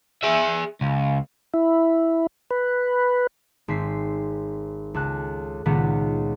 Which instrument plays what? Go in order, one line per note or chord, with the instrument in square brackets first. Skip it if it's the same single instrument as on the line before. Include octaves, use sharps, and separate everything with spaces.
[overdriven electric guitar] G#4 E5
C#2
[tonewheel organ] E4
B4
[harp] G#1 C4 B6 C7
C#2 A4 F#6
C#2 A#2 D#3 B3 F#5 B6